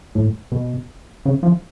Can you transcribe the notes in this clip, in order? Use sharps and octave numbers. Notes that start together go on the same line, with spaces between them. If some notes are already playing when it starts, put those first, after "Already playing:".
A2
B2
C#3
F3